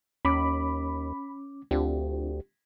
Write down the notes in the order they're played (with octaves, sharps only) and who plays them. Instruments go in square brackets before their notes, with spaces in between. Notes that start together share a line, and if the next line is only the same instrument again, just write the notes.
[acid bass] D#2 [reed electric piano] C#4 D6 [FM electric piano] B5
[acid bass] D2 [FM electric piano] C4 D4 F4 [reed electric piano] G4